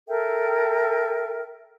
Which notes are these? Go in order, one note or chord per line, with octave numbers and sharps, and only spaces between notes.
A4 A#4 E5 G5